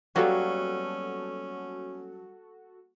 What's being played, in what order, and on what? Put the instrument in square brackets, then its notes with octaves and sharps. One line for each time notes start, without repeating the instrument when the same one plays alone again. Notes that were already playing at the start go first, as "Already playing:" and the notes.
[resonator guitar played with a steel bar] F#3 [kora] G3 A#3 B3 [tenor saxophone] C#4 [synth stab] F#4 A4